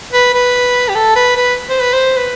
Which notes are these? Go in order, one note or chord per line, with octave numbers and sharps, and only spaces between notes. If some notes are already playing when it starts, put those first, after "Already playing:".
B4
B4
G4
A4
B4
B4
C5
B4
C5
B4